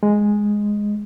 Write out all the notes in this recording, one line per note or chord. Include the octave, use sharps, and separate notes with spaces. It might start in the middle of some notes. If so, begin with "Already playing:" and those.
G#3